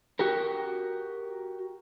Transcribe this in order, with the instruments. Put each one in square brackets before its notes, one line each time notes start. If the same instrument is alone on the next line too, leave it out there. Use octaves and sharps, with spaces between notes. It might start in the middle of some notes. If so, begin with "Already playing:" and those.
[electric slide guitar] F#4 G4 A#4